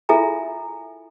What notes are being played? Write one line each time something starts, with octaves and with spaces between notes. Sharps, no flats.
E4 F4 A4 E5 G#5 A#5